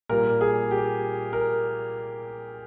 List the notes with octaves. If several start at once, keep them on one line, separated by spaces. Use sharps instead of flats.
A#2 G3 A#4
G#4
G4
A#4